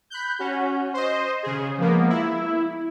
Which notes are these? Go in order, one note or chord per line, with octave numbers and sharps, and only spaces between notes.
B5 F#6 G6
C#4 F#4
C5 D#5
C#3 G#4
F3 G#3 A#3 B3
E4